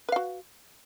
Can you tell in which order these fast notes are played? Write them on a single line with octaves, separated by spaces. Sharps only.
B4 F5 F#4